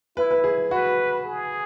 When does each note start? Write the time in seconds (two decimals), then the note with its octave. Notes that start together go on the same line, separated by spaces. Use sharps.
0.17 E4 B4
0.31 B4
0.44 G#4
0.71 F#4 B4
1.25 G#4